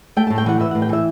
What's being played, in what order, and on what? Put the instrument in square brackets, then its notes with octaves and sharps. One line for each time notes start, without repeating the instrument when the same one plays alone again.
[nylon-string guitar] A3 G5
A2 A5
G5
E3 F#5
E3 E5
A2 F#5
G5
E3 E5